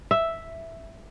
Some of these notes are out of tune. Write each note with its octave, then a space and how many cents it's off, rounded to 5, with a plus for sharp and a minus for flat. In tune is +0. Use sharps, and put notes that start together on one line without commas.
E5 +0